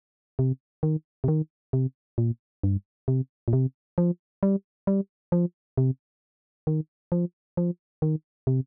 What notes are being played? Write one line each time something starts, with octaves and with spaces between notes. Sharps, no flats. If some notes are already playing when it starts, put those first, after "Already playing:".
C3
D#3
C3
D#3
C3
A#2
G2
C3
A#2
C3
F3
G3
G3
F3
C3
D#3
F3
F3
D#3
C3